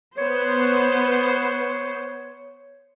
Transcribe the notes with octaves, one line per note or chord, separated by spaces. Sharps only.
B3 C5 C#5